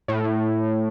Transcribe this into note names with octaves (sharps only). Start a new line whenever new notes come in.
A2